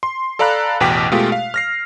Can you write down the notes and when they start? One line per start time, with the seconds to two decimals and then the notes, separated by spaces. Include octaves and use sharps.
0.03 C6
0.39 A4 D5 F5 A#5 B5 F#6
0.80 A1 E2 B2 G5 D6 B6
1.12 B2 G#3 A3 F4 G4
1.32 F5
1.54 F6 A#6 C7